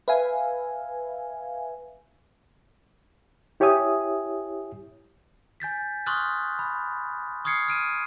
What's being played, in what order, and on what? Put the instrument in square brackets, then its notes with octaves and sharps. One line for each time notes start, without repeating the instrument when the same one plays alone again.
[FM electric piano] B4 E5 F5 G#5
[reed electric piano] E4 G4 C#5 E5 G#5 D#6
[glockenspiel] G#5 G6 A6 B6
C6 C#6 D#6 F6 F#6 A6
B5
C#6 D#6 F6 G#6 C7 C#7
F6 D7 D#7